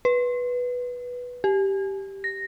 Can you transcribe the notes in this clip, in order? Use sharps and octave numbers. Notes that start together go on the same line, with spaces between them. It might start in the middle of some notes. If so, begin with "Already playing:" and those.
B4
G4
A#6